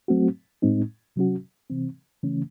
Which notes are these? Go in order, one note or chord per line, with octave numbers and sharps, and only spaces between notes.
F#3 A3 C4 F#4
A2 G#3 C4 D#4
C3 F#3 C#4 F#4
C3 E3 C4
C#3 E3 A3 C#4